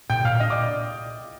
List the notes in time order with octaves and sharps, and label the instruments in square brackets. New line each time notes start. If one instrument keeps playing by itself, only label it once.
[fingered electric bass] A#2 [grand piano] G5 G6
[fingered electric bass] A#2 [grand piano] F5 F6
[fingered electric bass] D4 [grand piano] D#5 D#6
[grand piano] D5 D6